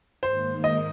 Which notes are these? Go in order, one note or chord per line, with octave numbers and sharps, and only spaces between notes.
G#2 D#3 A#3 C5
D#5